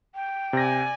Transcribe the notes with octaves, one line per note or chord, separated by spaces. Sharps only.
G5
C3 D5 G#5 A#6